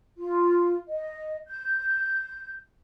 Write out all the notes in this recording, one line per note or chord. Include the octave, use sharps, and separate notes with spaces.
F4
D#5
G6